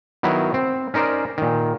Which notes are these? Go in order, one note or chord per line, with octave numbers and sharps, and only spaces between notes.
D#3 F#3 B3 E4
C4
C#4 D#4 A#4 C5 D5
A#2 D#3